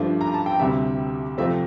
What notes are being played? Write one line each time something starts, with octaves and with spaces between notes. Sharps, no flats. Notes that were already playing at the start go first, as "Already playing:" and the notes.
Already playing: G2 F3 A3 D4
A#5
A5
G5
D2 C3 G3 E5
F2 C3 F3 A3 C4 E5